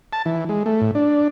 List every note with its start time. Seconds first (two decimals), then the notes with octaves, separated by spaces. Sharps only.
0.13 A5
0.26 E3
0.49 G#3
0.66 A3
0.81 A2
0.95 D4